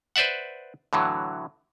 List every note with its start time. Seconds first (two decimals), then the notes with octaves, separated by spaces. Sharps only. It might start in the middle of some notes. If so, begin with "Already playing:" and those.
0.16 B4 C5 D5 E5 F#5
0.93 A2 D3 E3 F#3